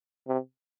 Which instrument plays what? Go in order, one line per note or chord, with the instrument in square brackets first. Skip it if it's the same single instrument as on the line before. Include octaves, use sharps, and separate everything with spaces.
[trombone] C3